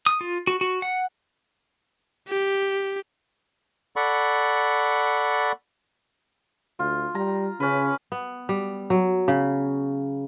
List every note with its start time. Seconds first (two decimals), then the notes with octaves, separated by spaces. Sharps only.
0.06 D#6
0.21 F4
0.47 F#4
0.61 F#4
0.82 F#5
2.28 G4
3.96 A4 D5 F#5 B5 C#6
6.79 D2 F4
7.15 G3 A#5
7.60 C#3 C#4 B4
8.12 B3
8.49 G3
8.90 F#3
9.28 C#3